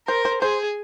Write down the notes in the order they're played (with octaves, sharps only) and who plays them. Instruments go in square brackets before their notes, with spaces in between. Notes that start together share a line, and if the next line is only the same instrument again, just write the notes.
[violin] A#4 [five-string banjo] C5
[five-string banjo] C5
[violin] G#4 [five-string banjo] C5